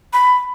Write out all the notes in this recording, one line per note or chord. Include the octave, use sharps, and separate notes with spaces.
B5